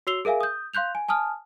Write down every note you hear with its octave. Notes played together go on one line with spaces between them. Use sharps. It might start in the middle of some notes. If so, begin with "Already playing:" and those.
F#4 C#5 E6 C7 F7 G7
G#4 A#4 E5 F5 G#5
D#6 G6
F5 C6 F#6 G6 F7
G#5
G#5 A5 D#6 F6